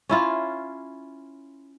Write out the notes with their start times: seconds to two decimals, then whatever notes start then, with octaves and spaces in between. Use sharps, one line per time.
0.09 C#4 E4 F4